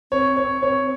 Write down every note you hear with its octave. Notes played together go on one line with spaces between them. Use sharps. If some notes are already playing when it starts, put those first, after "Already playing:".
C4 C#5
C#5
C#5